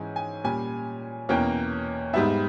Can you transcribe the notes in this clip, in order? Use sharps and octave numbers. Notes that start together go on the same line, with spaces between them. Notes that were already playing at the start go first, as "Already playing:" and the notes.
Already playing: G#2 E3 G#3 C#4 G#5
G#5
A#2 G3 C#4 G#5
E2 B2 A#3 C#4 G5
G#2 G3 B3 E5